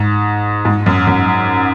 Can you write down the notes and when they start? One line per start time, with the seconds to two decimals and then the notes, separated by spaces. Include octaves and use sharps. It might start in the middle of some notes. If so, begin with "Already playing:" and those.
Already playing: G#2
0.65 G#2
0.86 F#2
1.07 F#2